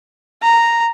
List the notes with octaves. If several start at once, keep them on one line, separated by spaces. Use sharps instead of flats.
A#5